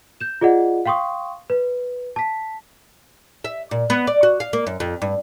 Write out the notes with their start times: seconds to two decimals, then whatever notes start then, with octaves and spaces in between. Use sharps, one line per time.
0.20 G6 E7
0.41 F4 G#4 D5 D#5 F#5
0.86 F5 G5 C6 C#6 D#6
1.50 B4
2.16 A5 B6
3.44 E5
3.71 A#2
3.90 B3
4.07 D5
4.23 F#4
4.40 F5
4.53 A#3
4.67 F#2
4.80 F2
5.02 G2